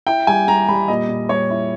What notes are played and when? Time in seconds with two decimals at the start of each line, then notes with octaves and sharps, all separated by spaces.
0.07 E4 G5
0.27 G3 G#5
0.48 G3 A#5
0.69 G3 B5
0.88 A#2 D#5
1.09 A#2
1.29 G3 C#5
1.50 E4